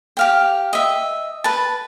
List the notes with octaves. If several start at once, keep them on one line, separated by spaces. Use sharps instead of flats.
G4 F5 G5
D#5 E5
B4 A5